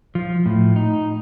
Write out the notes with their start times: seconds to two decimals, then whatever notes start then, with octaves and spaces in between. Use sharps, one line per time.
0.15 F3
0.46 A2
0.76 D#4